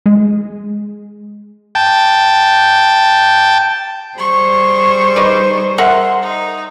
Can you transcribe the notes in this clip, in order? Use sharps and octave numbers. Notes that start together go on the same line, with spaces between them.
G#3
G5 A5
G3 G#4 C5 C#6
D#4 B4 D5
A#4 E5 F#5 C6
D#4